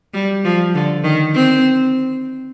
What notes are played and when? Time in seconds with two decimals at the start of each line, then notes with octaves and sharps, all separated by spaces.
0.14 G3
0.45 F3
0.75 D3
1.04 D#3
1.35 C4